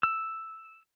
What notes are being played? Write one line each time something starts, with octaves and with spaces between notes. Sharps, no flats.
E6